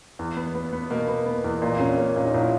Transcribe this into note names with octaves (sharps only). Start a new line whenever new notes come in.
E2
B3
B3
B3
B2 A#3
B3
B3
E2
A#2
A#1 C#4
A#3 C#4
A#2
D#4
A#1 E4